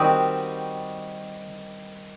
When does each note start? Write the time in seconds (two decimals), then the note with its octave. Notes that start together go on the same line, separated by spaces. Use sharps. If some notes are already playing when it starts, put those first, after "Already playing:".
Already playing: D#3 G3 C4 D#4 F#4